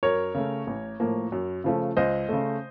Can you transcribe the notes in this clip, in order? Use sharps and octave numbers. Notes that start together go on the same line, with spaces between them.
F#2 A#4 C#5
C#3 A3
A1
A2 F3 A#3
F#2
C#3 F3 A3
C#2 C5 D#5
C#3 A3